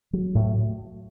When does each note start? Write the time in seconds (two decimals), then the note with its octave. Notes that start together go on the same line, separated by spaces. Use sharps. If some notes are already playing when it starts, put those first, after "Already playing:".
0.13 F#3
0.35 A2